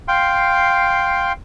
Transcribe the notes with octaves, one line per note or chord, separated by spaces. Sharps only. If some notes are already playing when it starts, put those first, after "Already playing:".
F5 G5 C6